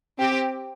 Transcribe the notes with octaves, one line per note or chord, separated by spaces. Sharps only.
C4 G4